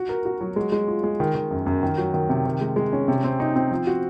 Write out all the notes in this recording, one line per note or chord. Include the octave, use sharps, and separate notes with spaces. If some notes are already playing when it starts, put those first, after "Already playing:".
Already playing: F#4
A#4
F#4
F#3
G#3
G#3
F4
G#3
D#3
D#3
F#2
F#2
D#3
F#3
D#3
C3
D#3
G#3
G#3
C#4
C3
C4
D#4
C4
F3
F#4